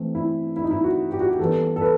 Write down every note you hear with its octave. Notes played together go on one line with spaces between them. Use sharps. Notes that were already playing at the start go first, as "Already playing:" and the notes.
Already playing: E3 A3 C4
E4
E4
D#4
E4
F#4
G4
F#4
G4
E3 G3 B3 A4
A4
B4